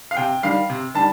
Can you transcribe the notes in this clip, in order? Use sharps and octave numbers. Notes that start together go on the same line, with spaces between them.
F5
C3 G5
D#3 G3 F5
C3
D#3 G3 A5